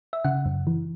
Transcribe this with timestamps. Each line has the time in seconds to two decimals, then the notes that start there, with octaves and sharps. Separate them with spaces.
0.13 E5
0.24 C#3 F#5
0.46 F#2
0.67 E3